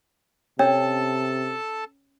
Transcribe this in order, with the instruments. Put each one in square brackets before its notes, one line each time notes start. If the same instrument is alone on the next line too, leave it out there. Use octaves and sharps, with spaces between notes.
[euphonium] C3 [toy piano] C#4 [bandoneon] A4 A5 [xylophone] C#5